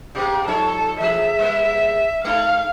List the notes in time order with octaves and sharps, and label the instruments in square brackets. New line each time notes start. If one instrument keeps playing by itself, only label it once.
[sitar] B2 A#3 [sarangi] G4
[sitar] F3 D#4 C#5 [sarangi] A4
[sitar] E3 A3 G#4 [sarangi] E5
[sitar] G3 G#3 A#3
[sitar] G#3 D#4 A4 [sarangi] F5